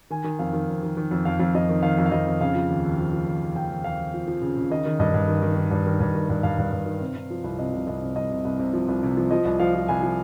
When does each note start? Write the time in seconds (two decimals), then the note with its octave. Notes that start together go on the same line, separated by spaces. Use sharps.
0.10 D#3 G#5
0.24 D#3
0.39 F2 F5
0.53 D#3
0.69 F2
0.83 D#3
0.97 D#3
1.11 F2
1.25 F2 F5
1.40 F2
1.54 F2 D#5
1.69 D#3
1.83 D#3 F5
1.98 F2
2.06 F5
2.11 F2 D#5
2.27 F2
2.41 C#3 F5
2.55 F3
2.69 D#2
2.84 D#2
2.98 F3
3.13 F3
3.26 D#2
3.41 D#2
3.55 D#2 G5
3.70 D#2
3.84 D#2 F5
3.99 D#2
4.14 F3
4.27 F3
4.42 C#3
4.57 C#3
4.70 D#3 D#5
4.85 D#3
4.99 G2 D#5
5.14 G2
5.28 D#3
5.42 D#3
5.57 D#3
5.71 G2
5.86 D#3
6.00 G2
6.15 D#3
6.30 G2
6.43 G2 F5
6.58 G2
6.72 G2
6.86 D#3
7.01 C3
7.16 C3
7.30 F3
7.44 C2
7.59 C3 D#5
7.73 C2
7.87 C2 D#5
8.02 C3
8.16 C2 D#5
8.31 C3
8.45 C2
8.59 C3
8.73 F3
8.88 C2
9.03 C3
9.17 F3
9.31 F3 D#5
9.45 C2
9.60 F3 F5
9.75 F3
9.88 C2 G#5
10.03 F3